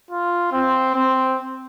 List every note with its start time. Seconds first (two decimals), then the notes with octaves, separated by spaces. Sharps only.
0.11 F4
0.52 C4
0.94 C4